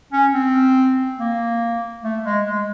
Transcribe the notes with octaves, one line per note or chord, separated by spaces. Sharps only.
C#4
C4
A#3
A3
G#3
G#3